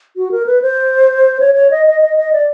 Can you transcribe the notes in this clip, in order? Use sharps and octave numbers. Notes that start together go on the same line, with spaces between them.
F#4
A#4
B4
C5
C#5
C#5
D#5
D#5
D#5
D#5
D5